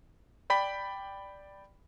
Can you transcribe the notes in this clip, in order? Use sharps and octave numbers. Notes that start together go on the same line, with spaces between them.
D5 G5 B5 B6